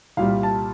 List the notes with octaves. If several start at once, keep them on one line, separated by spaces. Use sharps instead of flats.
C2 A#2 G3 F5
A5